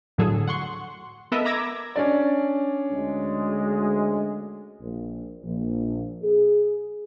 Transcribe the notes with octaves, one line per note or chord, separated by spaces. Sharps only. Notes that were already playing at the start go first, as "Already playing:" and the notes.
F2 A2 D3 F#3 G#4 A4
F#5 C6 C#6
B3 A4 A#4 D#5 E5
A#5 B5 D6 E6 G#6 A#6
C#4 D4 D5
D2 G#3
A#1
A#1
G#4